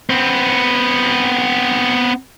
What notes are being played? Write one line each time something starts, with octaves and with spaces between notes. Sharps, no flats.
B3 C4